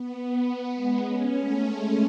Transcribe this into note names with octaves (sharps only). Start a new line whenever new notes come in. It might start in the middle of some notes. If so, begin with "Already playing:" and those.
Already playing: B3
B3
G#3
C#4
A3
G#3